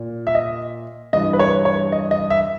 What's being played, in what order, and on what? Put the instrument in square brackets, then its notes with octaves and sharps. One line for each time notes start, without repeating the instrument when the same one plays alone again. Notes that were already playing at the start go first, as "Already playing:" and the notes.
Already playing: [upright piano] A#2
E5
D#5
G2 E3 D#5
B4
C#5
C#5
D#5
D#5
E5